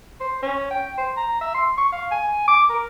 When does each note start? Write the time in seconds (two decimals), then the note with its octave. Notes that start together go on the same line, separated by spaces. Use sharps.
0.20 C5
0.42 C#4
0.71 G5
0.98 C5
1.17 A#5
1.41 E5
1.54 C6
1.77 C#6
1.92 F5
2.12 G#5
2.47 D6
2.69 A#4